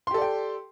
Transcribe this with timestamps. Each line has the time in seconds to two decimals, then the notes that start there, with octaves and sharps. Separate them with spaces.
0.07 C6
0.11 G4
0.14 A4
0.18 D5
0.22 G5